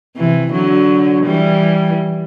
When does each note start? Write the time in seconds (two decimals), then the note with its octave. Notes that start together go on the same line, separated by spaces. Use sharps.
0.16 C3 E3
0.52 D3 F#3
1.26 E3 G3